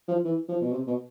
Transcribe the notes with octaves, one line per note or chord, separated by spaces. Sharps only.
F3
E3
F3
B2
C3
B2